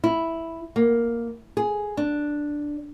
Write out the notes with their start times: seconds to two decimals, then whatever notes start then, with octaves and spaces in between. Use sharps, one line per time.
0.04 E4
0.76 A#3
1.57 G#4
1.97 D4